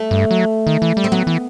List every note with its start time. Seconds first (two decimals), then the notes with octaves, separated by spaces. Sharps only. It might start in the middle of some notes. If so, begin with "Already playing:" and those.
Already playing: A3
0.11 G2
0.31 F#3
0.67 D#3
0.82 E3
0.97 G3
1.04 C4
1.12 F#3 B3
1.27 E3